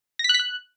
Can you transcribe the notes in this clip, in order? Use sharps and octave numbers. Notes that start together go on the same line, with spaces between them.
A#6
B6
F#6
B6
F#6